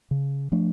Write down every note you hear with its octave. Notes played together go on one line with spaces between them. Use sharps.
C#3
F3 A3 D4